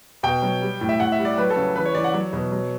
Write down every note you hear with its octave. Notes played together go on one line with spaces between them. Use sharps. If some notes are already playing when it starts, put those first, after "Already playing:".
B2 G5
F#3
G3
A2
E5
A2 F#5
E5
G3
D5
F#3 B4
A4
C#3
E3 B4
C#5
E3 D5
F#5
F#3
B2
F#3